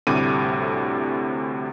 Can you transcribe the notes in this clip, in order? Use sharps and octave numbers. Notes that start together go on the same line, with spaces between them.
D2 A2 C3 G3 D6 D#7